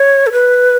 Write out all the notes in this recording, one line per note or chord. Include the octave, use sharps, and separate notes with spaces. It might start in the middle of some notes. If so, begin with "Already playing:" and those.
Already playing: C#5
A4
B4